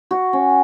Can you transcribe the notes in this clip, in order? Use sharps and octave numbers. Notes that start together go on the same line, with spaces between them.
F#4
C#4